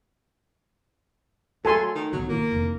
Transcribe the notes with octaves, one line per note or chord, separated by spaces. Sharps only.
F#3 A3 A4 G#5 C6
D#3
B1 D#3 F#3
D#3 A#3 E4
F1